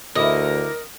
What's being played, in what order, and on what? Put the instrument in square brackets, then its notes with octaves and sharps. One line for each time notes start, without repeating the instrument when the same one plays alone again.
[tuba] D2 [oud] D3 E4 [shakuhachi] A#4 [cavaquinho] D#5